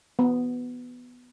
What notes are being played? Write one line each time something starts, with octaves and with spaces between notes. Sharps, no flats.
B3